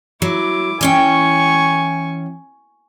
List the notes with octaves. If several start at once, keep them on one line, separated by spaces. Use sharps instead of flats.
F#3 E4 D6
E3 C#4 G5 G#5 C#6